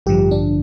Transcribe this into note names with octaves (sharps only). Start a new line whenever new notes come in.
A1 G2 D3 F3 G4
D4